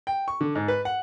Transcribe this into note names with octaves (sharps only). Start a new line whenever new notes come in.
G5
C#6
D3
G#2
B4
F#5